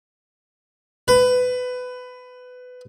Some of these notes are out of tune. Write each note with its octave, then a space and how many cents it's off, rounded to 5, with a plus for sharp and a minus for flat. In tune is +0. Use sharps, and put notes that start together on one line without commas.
B4 +20